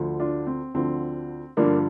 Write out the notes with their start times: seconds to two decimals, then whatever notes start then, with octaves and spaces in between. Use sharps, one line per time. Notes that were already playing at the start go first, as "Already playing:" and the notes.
Already playing: D2 D3 F3
0.20 D4 F4
0.47 C4
0.74 D2 D3 F3 C4
1.57 G2 D3 F3 A#3 D4